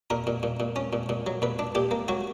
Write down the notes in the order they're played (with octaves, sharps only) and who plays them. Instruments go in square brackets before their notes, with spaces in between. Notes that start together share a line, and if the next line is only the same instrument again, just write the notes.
[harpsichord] A#2 A#4
A#2
A#2
A#2
C#4
A#2
A#2
F#3
A#2 B4
D4
A#2 G4
A#3
F#3 F#4